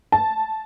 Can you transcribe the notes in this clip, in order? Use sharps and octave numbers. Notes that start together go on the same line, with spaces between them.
A5